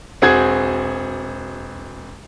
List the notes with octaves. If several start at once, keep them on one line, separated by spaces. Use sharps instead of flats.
E1 C4 F#4 G#4 G#6